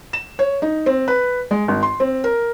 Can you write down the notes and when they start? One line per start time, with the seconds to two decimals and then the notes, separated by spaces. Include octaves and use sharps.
0.13 E7
0.39 C#5
0.62 D#4
0.86 C4
1.08 B4
1.51 G#3
1.68 G#1
1.83 C6
2.00 C4
2.24 A#4